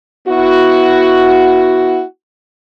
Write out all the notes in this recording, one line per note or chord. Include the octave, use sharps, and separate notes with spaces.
B3 E4 F#4